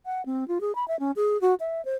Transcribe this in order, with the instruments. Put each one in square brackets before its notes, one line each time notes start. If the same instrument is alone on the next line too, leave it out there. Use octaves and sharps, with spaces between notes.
[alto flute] F#5
C4
F4
G#4
B5
E5
C#4
G#4
F#4
E5
C5